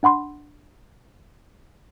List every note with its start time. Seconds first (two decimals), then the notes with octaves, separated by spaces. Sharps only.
0.03 D4 F#5 B5 C6